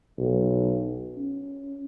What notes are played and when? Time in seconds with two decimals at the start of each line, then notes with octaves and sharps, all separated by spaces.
0.18 B1
1.17 C#4